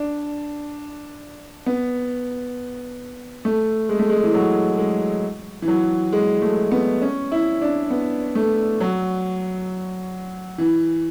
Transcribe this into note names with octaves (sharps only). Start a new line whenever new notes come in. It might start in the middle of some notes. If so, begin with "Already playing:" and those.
Already playing: D4
B3
A3
G#3
A3
G#3
E3
F#3
G#3
E3
F#3
G#3
A3
B3
C#4
E4
D4
B3
A3
F#3
E3